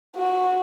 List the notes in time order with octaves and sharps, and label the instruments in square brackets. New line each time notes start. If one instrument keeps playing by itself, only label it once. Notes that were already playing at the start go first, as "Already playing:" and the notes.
[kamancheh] F#4